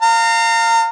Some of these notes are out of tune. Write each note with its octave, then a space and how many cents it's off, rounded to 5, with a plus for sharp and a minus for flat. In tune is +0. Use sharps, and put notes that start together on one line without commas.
F5 +0 A#5 -35